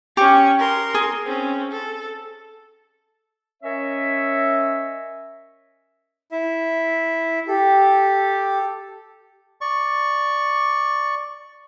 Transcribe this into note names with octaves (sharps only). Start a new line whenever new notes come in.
C#4 G4 C#6
A#4 C6
G#4
C4 C#4
A4
C#4 A#4 C#5 D#5 E5
E4 E5
G4 A4
D5 C#6